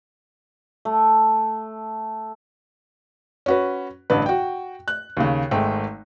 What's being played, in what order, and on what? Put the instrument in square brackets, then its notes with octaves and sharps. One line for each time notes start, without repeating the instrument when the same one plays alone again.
[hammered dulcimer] A3
[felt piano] C#4 F#4 B4
A1 G2 D3 B4
F#4 G5
F#6
D#2 C#3
G#1 G#3 A3 G5